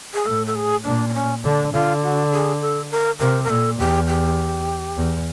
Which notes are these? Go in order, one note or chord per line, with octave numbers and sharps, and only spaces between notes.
G#4
A2 A4
A4
G#4
A#2 D4
D4
C#4
D3 D4
D3 F4
F#4
G#4
A4
A#4
C3 A#4
A#4
A#2 A4
E2 G4
G4
E2